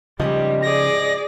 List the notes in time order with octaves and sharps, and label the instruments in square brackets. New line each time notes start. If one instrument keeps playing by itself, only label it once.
[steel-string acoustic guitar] G#2 D4 D#5 [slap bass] C#3 F3 [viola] G3
[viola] G#4 D5 [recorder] A#6